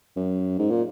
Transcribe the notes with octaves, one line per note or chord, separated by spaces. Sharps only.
F#2
G#2
A#2